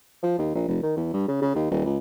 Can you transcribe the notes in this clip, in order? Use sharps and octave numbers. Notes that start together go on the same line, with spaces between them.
F3
D#2
A#1
F1
D#3
E2
G2
C#3
C#3
D#2
D#1
C#2